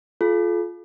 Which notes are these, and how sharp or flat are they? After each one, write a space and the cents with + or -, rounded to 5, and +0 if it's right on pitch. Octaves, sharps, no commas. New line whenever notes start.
F4 +0 A4 -45